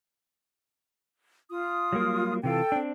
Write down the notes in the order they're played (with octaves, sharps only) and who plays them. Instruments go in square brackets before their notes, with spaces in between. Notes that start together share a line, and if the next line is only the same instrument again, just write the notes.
[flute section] F4 D#6
[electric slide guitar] F#3 G3 A#3
[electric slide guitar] C3 E3 F4 [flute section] A4 G5
[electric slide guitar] C4 D4